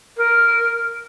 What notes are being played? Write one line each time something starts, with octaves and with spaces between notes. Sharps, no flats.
A#4